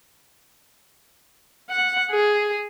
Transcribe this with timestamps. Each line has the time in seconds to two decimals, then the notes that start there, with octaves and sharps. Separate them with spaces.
1.70 F#5
2.11 G#4